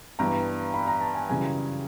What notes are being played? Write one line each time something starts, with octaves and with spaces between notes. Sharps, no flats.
G2 E3 G3 B3 A#5
B5
A#5
A5
G#5
F#2 C#3 E3 G3 G#5